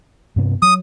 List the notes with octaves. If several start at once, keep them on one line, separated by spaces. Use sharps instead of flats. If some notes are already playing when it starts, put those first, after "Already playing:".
G2 C3 B3
F#3 D#6